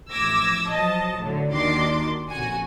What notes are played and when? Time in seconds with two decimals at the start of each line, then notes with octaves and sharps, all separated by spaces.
0.11 A1 F3 D6 E6 G#6 A#6
0.69 F3 F#3 D#5 A5
1.18 A2 D3 F#3
1.50 D#2 D#3 D4 F#4 C6 D6
2.29 A#1 F2 C#3 F#4 G#5